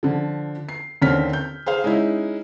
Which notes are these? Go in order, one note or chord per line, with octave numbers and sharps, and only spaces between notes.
D3 F3
C7
D#2 D3 C4 C#4 F6 B6
G6
G#4 C5 F5
G#3 C#4 D#4 E4